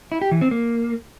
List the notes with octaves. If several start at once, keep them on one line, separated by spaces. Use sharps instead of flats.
E4
G4
E3
C4
A#3